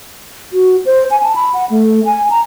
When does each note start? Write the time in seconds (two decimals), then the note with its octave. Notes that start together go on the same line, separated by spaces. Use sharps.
0.53 F#4
0.86 C5
1.11 G#5
1.23 A5
1.36 B5
1.54 F#5
1.70 A3
2.05 G#5
2.30 A#5